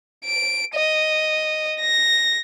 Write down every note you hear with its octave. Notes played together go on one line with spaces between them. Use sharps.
D7
D#5
A#6